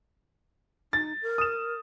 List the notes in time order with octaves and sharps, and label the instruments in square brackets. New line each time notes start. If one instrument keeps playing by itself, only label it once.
[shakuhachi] D#4 [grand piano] A6
[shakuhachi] A#4
[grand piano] D#6 E7